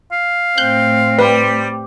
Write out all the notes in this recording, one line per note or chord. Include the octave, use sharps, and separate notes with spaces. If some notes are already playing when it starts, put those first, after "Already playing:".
F5
A2 C4 F#6 G6
G3 B4